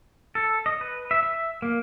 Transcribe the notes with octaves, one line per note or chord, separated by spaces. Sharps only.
A4
D#5
B4
E5
E5
A#3